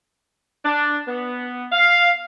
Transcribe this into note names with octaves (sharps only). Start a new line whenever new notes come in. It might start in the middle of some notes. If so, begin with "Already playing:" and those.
D4
B3
F5